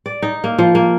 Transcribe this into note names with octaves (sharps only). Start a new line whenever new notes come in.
D5
D#4
A#3
F3
A#3